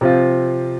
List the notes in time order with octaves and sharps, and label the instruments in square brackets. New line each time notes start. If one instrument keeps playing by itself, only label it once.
[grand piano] C3 F3 C4 F4